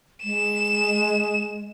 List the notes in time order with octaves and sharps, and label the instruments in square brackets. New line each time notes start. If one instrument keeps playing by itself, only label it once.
[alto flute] G#3 [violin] E7